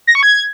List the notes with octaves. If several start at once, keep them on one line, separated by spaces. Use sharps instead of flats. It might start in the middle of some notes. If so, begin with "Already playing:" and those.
A#6
C#6
G#6